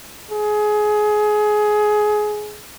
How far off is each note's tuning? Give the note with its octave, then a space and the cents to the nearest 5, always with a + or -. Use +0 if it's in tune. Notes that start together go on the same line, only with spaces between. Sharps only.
G#4 +20